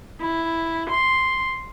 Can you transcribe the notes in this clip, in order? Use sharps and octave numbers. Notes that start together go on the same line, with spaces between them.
E4
C6